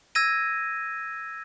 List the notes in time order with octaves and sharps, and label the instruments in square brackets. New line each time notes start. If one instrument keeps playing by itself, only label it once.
[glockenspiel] E6 G#6 A#6 D#7